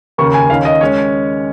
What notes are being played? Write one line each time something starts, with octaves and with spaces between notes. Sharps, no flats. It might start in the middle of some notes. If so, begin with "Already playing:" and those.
D#2 C#3 A#3 C#6
G#5
D#2 D#3 C#4 F5
D#5
G#3 C#4 C#5